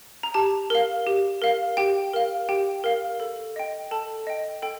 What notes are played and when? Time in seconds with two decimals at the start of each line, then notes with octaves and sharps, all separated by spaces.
0.23 A#5
0.34 G4 A5
0.70 A#4 F5
1.07 G4
1.42 A#4 F5
1.77 G4 G5
2.13 A#4 F5
2.49 G4 G5
2.84 A#4 F5
3.20 A4
3.56 D#5 G5
3.91 A4 A5
4.27 D#5 G5
4.62 A4 G5